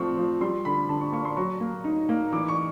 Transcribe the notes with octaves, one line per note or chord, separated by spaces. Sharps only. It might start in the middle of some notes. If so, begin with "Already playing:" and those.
Already playing: F3 A3 C4 C6 C#6
F3
G3 C6
D3 B5
D3 A5
C#6
A#3 C#6
C6
F#3 C#6
A#3
D#4
A#3
E3 D6
C#6